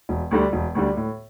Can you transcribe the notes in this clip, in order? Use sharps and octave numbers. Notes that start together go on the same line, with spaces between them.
E1
D2 D3 G3
E1
D2 D3 G3
A2